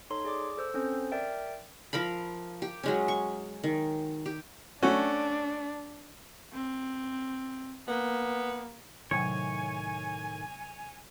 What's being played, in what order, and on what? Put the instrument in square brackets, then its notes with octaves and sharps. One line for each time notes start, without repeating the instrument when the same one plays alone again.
[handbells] D#4 A4 C#5 C6
G#4 D5 D6
A4 C5 E6
C4 C#4 A4 C5
A#4 D5 E5 G5
[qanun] F3 A#4 F5 B5
G4
F#3 G#3 C#4
C#6
D#3
G4
[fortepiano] A3 C#4 F#4 [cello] D4
[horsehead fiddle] C4
[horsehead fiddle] A#3 [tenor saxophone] B3
[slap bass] A2 D#3 [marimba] C3 F#3 [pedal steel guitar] C#5 [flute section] G#5